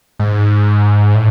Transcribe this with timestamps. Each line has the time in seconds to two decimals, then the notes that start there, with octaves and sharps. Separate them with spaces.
0.19 G#2
1.15 A2